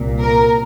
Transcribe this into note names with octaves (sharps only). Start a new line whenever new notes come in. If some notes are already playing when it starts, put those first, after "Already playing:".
Already playing: C2 A#2
A#4